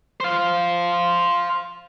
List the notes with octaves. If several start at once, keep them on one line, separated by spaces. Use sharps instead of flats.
C5 F5